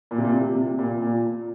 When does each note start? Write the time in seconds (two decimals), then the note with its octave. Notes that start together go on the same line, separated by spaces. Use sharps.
0.11 A#2
0.18 C3
0.25 A#2
0.33 C3
0.55 C3
0.79 A#2
1.02 A#2